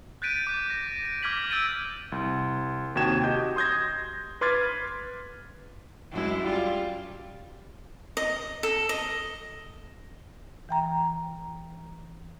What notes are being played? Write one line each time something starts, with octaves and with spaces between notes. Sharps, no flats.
F#6 G6 A6 B6 D7 D#7
D6 G6
A#6
D7
D6 F6 G#6 B6 F#7
E6 G6 A6 D7 D#7
C2
D#2 C3 F#4 G5 G#6 E7
F#4 G4 D#5 G6
C6 D#6 G6 G#6 A#6
B4 C6 D6 F6 G#6 A6
F#2 G#3 E4
G3 F4
D#5
A4
D#5
E3 G5 A#5